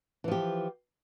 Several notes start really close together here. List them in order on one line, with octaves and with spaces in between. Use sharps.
E3 F3 G4